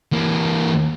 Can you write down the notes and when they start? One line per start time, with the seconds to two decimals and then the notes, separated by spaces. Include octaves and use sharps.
0.12 E3 A#3